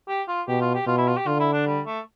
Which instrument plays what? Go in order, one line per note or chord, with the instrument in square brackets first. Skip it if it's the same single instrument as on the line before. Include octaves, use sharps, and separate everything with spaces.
[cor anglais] G4
F4
[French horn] B2 [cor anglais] G4
[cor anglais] F4
G4
[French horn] B2 [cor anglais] F4
[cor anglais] E4
F4
G4
[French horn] D3 [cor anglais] F4
[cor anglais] E4
D4
G3
A3